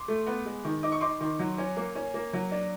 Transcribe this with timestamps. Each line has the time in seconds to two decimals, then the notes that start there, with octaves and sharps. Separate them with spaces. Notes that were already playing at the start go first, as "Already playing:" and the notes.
Already playing: C6 D6
0.08 A3
0.27 B3
0.45 G#3
0.65 D#3
0.83 D#4 D6
0.92 C#6
1.01 D#4 C6 D6
1.21 D#3
1.39 F#3
1.58 C#4
1.77 A#3
1.95 C#4
2.14 A#3
2.33 F#3
2.52 D4